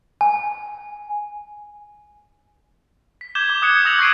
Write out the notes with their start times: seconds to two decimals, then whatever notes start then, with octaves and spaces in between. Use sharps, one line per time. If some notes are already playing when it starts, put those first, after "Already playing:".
0.21 G#5
3.21 B6
3.35 D6 G6 G#6 E7 G7
3.50 D6
3.62 D#6 F#6 G#6 C#7
3.85 D#6 E6 A#6 F7 F#7
3.99 C#6 G#6 A#6 C7 D7 D#7